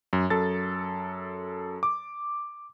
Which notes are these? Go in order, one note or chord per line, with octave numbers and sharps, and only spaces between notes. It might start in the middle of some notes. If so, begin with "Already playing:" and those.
F#2
F#2 A4 A6
D6